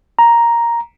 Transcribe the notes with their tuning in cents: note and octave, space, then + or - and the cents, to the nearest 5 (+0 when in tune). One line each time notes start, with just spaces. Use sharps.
A#5 +5